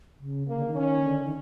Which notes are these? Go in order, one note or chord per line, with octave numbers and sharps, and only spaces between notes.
C#3
C#3 A#3
D3
D#3
C#4
D3
D#3